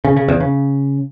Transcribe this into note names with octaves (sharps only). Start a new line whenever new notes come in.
C#3
C#3
E2
C#3